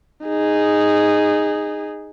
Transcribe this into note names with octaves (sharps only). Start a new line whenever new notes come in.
D#4 G#4